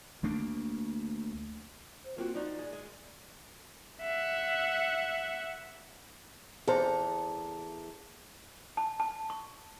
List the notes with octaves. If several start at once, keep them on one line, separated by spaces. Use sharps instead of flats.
D2 A3 A#3 D4
C5
A#3 C4 F4 F#4
F3 D#4 F#4 D5
G#3
G#3
E5 F#5
E2 G#4 A4 C5 A#5
A5
A5
C#6